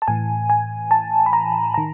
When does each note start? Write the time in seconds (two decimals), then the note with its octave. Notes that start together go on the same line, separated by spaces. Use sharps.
0.02 A5
0.08 A2 E3 G#5
0.50 G#5
0.91 A5
1.26 B5
1.33 A#5
1.74 D#3 A#5